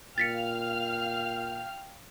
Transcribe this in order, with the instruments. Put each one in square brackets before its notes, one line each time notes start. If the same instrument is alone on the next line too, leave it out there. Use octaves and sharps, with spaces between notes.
[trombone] A#2 [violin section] F5 F6 [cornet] G5 [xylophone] A6 B6 C#7